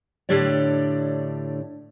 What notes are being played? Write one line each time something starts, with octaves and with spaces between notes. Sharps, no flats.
A2 D3 D4 G4 C#5 D5